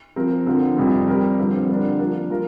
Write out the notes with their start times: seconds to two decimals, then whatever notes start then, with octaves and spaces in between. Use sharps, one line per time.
0.16 F3 C4 A#4
0.46 D3 F3 C4 A#4
0.76 F2 C3 G3 C4
1.07 G3 C4 G4 A#4
1.38 G2 D3 F3 C4
1.69 D3 G3 D4 A#4
1.99 F3 A#3 D4 F4
2.30 F3 A#3 F4 A#4